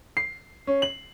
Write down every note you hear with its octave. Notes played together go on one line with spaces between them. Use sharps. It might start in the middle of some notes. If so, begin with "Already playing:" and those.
C7
C#4
F#7